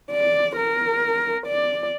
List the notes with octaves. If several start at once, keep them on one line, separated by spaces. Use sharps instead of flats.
D5
A#4
D5